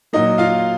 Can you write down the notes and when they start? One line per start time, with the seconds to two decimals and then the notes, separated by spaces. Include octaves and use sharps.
0.13 A#2 F#3 A#3 D#4 D#5
0.38 F4 F5